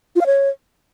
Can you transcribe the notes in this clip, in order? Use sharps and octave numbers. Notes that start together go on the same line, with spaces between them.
F4
F5
C#5